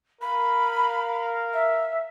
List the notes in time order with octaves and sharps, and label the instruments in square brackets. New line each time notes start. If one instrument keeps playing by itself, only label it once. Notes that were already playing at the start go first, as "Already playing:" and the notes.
[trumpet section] A#4 F5 [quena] B5
[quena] E5